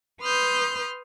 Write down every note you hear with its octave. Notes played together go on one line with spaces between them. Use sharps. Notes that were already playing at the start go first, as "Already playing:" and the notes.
B4 C6 D#6 F6 G6